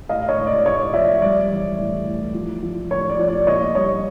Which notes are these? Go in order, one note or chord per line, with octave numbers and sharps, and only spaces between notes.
A2 D#5 F5
C#5 D#5
A2
D5
A2 C#5 D#5
F3 D5 E5
G3 D5
E3
A2
A2
F3
F3
A2 C#5
D5
F3
D5
A#2 C#5 D#5
G3 C#5 D#5